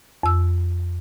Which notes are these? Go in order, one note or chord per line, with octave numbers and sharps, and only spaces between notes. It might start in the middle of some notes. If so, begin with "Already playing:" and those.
F2 E6